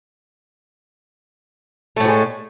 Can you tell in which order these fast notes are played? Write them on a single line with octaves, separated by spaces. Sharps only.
A3 A2 F3 G#3